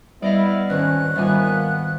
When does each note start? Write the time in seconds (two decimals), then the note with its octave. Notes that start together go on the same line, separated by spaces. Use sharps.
0.22 G3 B3 E4 D5 D#5 F5
0.70 G#1 C#4 B4 F#6
1.15 G#1 D#3 G3 A#3 B3 F4 G#5